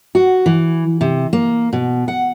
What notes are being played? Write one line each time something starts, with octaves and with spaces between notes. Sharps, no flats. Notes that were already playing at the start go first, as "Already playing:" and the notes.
F#4
E3
C3
A#3
B2
F#5